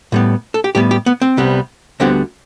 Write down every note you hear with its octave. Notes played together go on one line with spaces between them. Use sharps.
A2 G3 B3
A4
G4
A2 G3 B3 G4
G4
B3
C4
C2 C3 G3 B3
D2 D3 G3 B3 C4